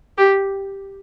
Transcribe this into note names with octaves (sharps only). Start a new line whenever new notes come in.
G4